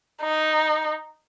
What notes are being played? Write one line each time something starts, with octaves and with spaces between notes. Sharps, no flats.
D#4